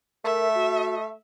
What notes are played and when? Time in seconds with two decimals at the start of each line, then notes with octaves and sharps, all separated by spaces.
0.25 A3 A#4 E5
0.55 F#4